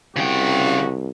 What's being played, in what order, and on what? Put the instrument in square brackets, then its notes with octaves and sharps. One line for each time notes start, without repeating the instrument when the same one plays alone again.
[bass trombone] C2 [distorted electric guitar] C#3 G5 [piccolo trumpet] F#4